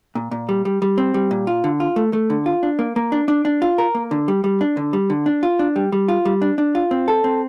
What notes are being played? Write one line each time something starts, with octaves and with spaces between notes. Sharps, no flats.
A#2
A#2
G3
G3
G3
C4
G3
A#2
F4
D3
F4
A3
A3
D3
F4
D4
A#3
A#3
D4
D4
D4
F4
A#4
A#3
D3
G3
G3
D4
D3
G3
D3
D4
F4
D4
G3
G3
F4
G3
D4
D4
F4
C4
A4
C4